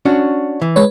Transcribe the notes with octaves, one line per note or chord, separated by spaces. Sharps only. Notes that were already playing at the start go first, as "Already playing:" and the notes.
C#4 D4 F#4
E3
G#3 B4 C#5